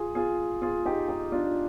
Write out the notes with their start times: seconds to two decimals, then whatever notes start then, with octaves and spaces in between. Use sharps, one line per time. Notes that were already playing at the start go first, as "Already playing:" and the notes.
Already playing: F4 G#4
0.15 F4 G#4
0.62 F4 G#4
0.85 D#4 G4
1.08 D#4 G4
1.32 D4 F4